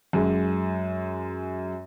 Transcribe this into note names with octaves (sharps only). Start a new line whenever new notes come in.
F#2 G#3